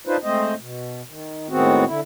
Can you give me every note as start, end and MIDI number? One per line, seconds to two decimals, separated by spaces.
0.07 0.17 62
0.07 0.17 63
0.07 0.17 65
0.07 0.17 71
0.07 0.17 72
0.24 0.54 56
0.24 0.54 57
0.24 0.54 60
0.24 0.54 72
0.24 0.54 75
0.59 1.02 47
1.08 1.49 51
1.49 1.84 45
1.49 1.84 51
1.49 1.84 56
1.49 1.84 59
1.49 1.84 60
1.49 1.84 66
1.87 2.00 50
1.87 2.00 64